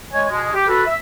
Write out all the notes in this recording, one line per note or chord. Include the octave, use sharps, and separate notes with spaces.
G#3 C#5 G#5
B2 G#3
G4
F#4 A4 B4
E5